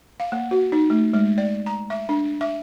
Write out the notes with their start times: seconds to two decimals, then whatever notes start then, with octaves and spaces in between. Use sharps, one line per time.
0.20 F5
0.32 A#3
0.51 F#4
0.72 D#4
0.90 A3
1.13 G#3
1.38 D5
1.66 A#5
1.90 E5
2.09 D4
2.41 E5